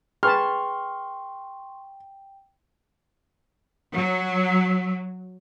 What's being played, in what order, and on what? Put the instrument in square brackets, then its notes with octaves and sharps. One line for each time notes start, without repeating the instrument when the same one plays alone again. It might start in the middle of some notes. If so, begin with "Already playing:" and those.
[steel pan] G#4 B4 A5 [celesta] G5 [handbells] C6 C#6 [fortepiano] F6
[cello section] F#3